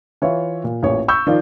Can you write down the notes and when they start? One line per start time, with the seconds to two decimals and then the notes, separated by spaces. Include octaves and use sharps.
0.22 E3 F4 C#5 E5
0.64 A#2
0.83 A1 A#2 C#5
1.08 B5 C#6 E6 G6
1.27 D#3 F3 D#4 F4 D5